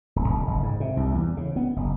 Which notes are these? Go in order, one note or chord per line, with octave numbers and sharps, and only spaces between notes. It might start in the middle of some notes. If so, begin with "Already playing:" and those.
D1
F1
F#1
G#2
C3
C2
E2
C#3
B3
F#1